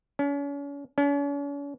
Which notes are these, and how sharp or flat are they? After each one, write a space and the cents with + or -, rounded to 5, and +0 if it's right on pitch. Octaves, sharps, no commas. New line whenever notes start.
C#4 +40
C#4 +45